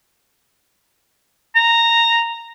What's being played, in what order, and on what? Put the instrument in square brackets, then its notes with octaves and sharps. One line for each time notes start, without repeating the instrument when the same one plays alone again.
[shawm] A#5